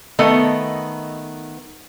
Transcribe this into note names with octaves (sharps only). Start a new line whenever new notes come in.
D#3 A3 B3 A4 D#5